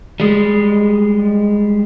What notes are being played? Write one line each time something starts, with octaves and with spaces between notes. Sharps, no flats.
G3 G#3